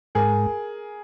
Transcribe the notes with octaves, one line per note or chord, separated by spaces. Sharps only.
G#2 G#4 A#4